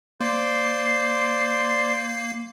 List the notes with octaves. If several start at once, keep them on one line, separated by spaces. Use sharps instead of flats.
A#3 C5 D5 C6 C7